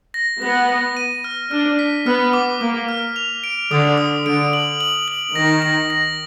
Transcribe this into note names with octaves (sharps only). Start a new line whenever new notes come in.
A#6
B3 A#6
A#6
D#7
F6
D4 F6
B6
B3 F6
D6
A#3 D6
F6
F7
D7
D3 D#6
D#6
D3 D7
F#7
F#7
F#7
D#3 A#6
A#6
A#6